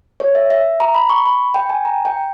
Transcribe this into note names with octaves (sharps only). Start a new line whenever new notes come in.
C#5
E5
E5
A#5
B5
C#6
B5
G5
G#5
A#5
G5